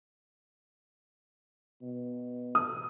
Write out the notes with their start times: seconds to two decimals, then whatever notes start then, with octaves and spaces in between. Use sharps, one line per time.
1.81 B2
2.55 D#6